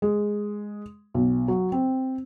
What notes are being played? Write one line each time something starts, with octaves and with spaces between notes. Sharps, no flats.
G#3
B1
F#3
C4